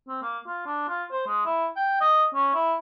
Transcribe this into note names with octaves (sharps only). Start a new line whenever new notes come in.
C4
A#3
F4
D4
F4
C5
G#3
E4
G5
D#5
C#4
E4